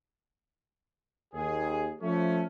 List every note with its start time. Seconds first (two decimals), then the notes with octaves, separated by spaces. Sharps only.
1.34 D#2 G#4
2.01 F3 A3 C#4